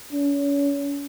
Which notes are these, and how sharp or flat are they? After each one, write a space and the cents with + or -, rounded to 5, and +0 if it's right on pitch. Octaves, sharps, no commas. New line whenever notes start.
C#4 +35